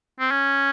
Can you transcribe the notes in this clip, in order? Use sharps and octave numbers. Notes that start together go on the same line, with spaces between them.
C4
C#4